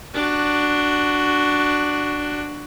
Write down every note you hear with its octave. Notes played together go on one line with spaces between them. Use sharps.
D4 F#4